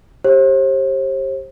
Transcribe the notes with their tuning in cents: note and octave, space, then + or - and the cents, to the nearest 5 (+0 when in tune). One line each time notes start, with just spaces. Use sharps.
G4 +0 C5 +40